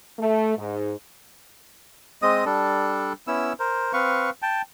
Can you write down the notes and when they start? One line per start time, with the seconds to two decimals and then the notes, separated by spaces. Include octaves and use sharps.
0.19 A3
0.57 G#2
2.22 G#3 C4 D#5 D#6
2.46 G3 D4 A4
3.27 B3 C#4 E4 E6
3.60 A#4 C5
3.93 C4 B4 F5 C#6
4.42 G5 A5